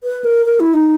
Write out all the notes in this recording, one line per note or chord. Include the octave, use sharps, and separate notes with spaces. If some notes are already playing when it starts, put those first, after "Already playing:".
B4
A#4
A#4
E4
D#4